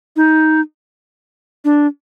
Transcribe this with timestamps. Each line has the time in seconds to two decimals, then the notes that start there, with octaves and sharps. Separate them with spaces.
0.16 D#4
1.65 D4